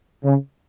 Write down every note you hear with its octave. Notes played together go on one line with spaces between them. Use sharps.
C#3